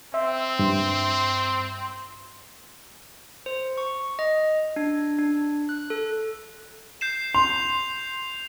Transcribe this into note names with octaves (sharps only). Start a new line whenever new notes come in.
C4 E5 C6
G2
C5
C#6
D#5
D4
D4
F#6
A4
G6 C7 E7
C6 F7